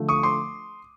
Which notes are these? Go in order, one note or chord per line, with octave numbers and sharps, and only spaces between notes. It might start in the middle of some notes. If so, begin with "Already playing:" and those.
Already playing: D3 F3 A3
C#6 D#6
C6 D6